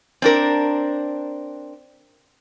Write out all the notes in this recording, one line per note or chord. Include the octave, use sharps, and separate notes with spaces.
C4 D4 A#4